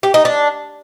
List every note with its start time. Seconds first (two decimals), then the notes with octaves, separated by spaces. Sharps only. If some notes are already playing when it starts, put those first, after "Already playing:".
0.03 G4
0.14 D#4
0.25 D4